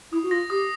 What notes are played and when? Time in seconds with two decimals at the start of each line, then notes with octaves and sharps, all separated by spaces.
0.12 E4 D#6
0.23 F#4
0.31 F4 A#6
0.50 G4 D#6